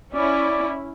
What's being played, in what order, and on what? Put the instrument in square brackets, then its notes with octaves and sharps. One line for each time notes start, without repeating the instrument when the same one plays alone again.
[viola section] C#4 E4 [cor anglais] D5